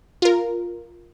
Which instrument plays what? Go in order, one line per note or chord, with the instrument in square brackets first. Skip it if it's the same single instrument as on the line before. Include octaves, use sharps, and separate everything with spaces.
[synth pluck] F4 A#4